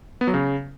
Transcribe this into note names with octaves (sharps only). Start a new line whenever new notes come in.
B3
F#3
C#3